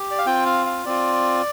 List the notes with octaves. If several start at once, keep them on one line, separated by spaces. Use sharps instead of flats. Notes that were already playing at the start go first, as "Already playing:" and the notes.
Already playing: G4
D5
F5
C4 F4 G5
F5
F5
C4 F4 D5